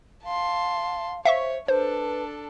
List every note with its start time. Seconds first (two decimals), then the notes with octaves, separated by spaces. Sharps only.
0.25 F5 A5 C6
1.25 C5 C#5 E5 F5 C#6
1.68 D4 A4 B4 C5